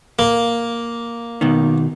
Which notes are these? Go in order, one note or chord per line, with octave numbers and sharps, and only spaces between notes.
A#3
B2 D#3